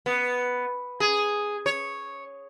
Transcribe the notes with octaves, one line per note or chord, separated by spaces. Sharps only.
B3
G#4
C#5